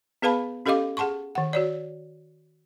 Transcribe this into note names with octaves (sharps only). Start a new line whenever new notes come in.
B3 G#4 B4 F5 A5 B5
C#4 G4 A4 D#5 F5 D6
G#4 F#5 A5 C6 C#6
D#3 F#5
F#4 C#5 D5